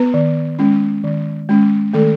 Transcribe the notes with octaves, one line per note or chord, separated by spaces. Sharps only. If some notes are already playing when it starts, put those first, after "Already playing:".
Already playing: B3 B4
D#3
G#3 C#4
D#3
G#3 C#4
D#3 A3 A4